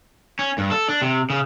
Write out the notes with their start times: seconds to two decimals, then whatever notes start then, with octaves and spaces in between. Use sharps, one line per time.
0.39 C#4
0.58 G2
0.71 A4
0.88 D4
1.02 C3
1.30 C#3